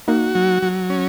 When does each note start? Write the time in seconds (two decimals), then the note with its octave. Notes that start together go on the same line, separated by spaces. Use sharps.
0.08 A#3 D#4 F#4
0.35 F#3
0.63 F#3
0.90 C#4